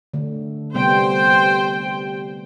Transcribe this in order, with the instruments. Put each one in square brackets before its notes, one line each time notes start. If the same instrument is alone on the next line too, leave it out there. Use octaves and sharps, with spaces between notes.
[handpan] D3 A3
[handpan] C3 G3 B3 [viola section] C5 G5